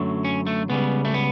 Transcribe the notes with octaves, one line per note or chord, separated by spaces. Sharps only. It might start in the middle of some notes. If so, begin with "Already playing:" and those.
Already playing: F#2 D3 F#3 A3
C#4
A3
C#2 C#3 G3 B3
A3
B3